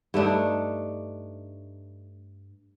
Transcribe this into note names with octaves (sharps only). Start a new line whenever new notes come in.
G2 A3 D4 D#4